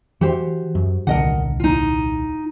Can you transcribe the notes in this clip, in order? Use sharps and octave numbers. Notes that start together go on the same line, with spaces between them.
E3 F#4 G4 C5
F#2
D#1 C2 D3 A#4 D#5 F#5
D#4 F4